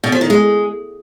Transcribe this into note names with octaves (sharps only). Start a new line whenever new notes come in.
B2
F3
D#3
G#3